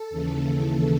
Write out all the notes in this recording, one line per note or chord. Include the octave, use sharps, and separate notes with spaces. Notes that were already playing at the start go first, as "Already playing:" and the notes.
Already playing: A4
D#2 C#3 E3